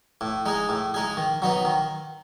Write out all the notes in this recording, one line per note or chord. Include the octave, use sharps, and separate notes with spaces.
A2
G#3 D#4 G#4
A2
G#3 D#4 G#4
D#3
F#3 B3 D#4
D#3